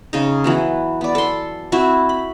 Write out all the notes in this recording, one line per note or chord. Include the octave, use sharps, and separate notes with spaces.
C#3 D#4
E3 F#3 B3
B3 D5
A4 C6
C4 E4 F#4
B5